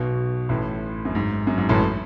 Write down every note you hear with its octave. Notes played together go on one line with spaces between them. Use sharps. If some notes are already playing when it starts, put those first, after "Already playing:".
Already playing: B1 B2
A1 A2
F#2
G#2
F#2
G#2
A1 A2